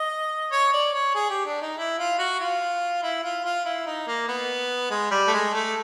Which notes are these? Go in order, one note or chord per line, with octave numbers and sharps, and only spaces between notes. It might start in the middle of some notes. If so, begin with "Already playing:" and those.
Already playing: D#5
C#5
D5
C#5
G#4
G4
D4
D#4
E4
F4
F#4
F4
E4
F4
F4
E4
D#4
A#3
B3
G#3
G3
A3
G#3
A3